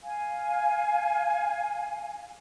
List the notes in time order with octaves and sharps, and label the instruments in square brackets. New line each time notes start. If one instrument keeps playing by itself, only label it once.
[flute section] F5 G#5